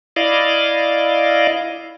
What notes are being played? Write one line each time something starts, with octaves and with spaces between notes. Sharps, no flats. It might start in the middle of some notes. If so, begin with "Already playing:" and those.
E4 D5 D#5 F5